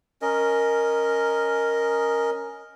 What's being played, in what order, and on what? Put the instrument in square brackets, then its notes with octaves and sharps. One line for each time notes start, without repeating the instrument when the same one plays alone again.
[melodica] C#4 A#4 D#5